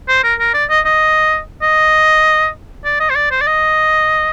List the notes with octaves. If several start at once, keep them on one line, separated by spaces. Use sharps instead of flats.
C5
A#4
A#4
D5
D#5
D#5
D#5
D5
D#5
C5
D5
C5
D5
D#5